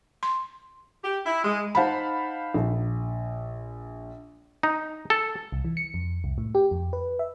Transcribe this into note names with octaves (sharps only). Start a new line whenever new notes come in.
C6
G4
E4
G#3
D#4 C5 F5 F#5 A5 B5
A#1
D#4
A4
C2
E3
C#7
F2
C2
A2
G4
F2
B4
E5